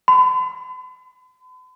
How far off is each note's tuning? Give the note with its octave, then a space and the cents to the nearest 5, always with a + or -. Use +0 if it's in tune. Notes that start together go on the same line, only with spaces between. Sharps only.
B5 +45